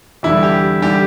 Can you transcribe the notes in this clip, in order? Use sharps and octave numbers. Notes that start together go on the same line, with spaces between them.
E2 D3 G3 E4
G4
D3 G3 G4